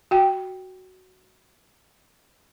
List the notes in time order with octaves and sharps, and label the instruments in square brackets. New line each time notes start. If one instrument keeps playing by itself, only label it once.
[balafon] F#4 G5